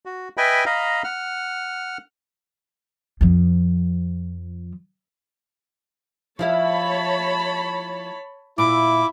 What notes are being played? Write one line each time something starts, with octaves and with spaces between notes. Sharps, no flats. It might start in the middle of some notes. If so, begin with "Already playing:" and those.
F#4
B4 D#5 E5 G5 G#5 B5
D#5 F5 A#5 B5
F#5 F6
F2 F3
F3 E4 C#5 F5 A5 B5
A#2 E4 D6